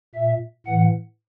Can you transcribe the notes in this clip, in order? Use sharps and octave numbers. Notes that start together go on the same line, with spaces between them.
A#2 E5
A2 E3 F#5